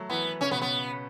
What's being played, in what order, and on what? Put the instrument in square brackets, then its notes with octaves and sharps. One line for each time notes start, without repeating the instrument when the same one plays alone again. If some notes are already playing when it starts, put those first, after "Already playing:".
Already playing: [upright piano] F#3 A3
[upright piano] E3 [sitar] B3
[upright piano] C#3 [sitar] C#4
[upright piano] B2 [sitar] B3
[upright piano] C#3
[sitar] B3